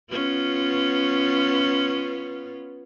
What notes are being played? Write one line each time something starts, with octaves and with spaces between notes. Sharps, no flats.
B3 C#4 F4